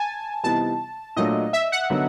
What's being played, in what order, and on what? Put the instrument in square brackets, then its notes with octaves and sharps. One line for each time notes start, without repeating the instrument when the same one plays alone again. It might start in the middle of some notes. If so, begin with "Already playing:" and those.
Already playing: [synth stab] G#5 A5
[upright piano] C3 E3 G3 B3 D#4 [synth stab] A5
[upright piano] A#2 F#3 A3 D4 [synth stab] D#5
[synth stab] E5
F#5
[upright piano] D3 F#3 B3 D#4